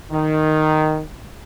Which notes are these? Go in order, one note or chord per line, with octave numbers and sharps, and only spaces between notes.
D#3